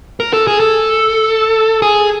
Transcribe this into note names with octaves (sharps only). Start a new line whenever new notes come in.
A#4
A4
G#4
A4
G#4